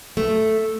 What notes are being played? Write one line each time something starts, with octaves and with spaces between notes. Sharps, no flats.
A3